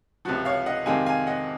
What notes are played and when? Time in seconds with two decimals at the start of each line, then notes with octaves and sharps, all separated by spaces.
0.25 C#2 C3 F3 F#4
0.45 C#5 F5
0.66 D#5 F#5
0.86 F2 C3 D#3 G#3 C4 F5 G#5
1.06 F5 G#5
1.27 D#5 F#5